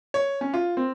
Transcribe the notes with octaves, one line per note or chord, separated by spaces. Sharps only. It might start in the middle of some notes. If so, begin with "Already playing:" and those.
C#5
C#4
F4
C4